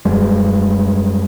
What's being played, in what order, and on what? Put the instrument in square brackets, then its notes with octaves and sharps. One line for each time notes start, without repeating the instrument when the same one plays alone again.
[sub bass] D#1 [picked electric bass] F#2 G3 G#3